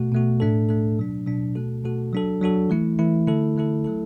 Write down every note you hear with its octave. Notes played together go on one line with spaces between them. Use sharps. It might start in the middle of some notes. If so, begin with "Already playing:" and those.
Already playing: B2 A3 F#4
B2 A3 F#4
A2 A3 D4 A4
A2 A3 D4 A4
B2 F#3 D4
B2 F#3 D4
B2 A3 F#4 A4
B2 A3 F#4 A4
F#3 D4 F#4 A4
F#3 D4 F#4 A4
E3 A3 E4
E3 A3 E4
D3 A3 E4 A4
D3 A3 E4 A4
F#3 A3 E4 A4